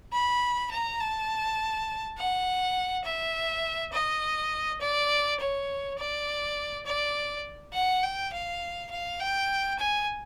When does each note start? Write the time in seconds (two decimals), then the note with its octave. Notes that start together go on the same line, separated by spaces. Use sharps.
0.13 B5
0.71 A#5
1.00 A5
2.18 F#5
3.05 E5
3.93 D#5
4.81 D5
5.40 C#5
5.99 D5
6.86 D5
7.74 F#5
8.03 G5
8.33 F5
8.91 F5
9.20 G5
9.79 G#5